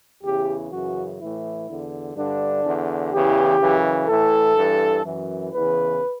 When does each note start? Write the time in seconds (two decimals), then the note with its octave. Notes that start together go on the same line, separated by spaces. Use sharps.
0.23 E2 C#3 E3 G4
0.71 F#2 C#3 E3 F#4
1.20 A2 E3 E4
1.68 E2 D3
2.16 G2 D3 D4
2.64 E2 D3
3.12 E2 C#3 E3 G4
3.59 F#2 C#3 E3
4.08 A2 E3 A4
4.56 G2 E3
5.04 F#2 E3
5.53 E2 C#3 E3 B4